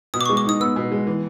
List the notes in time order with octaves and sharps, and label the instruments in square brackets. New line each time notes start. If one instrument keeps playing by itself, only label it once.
[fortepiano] B2 [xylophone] D#6
[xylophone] D6
[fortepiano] G#3 [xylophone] C#6
[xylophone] D6
[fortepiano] D#4 [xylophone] D#6
[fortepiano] B3 [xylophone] E6
[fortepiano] B2
G#3
E3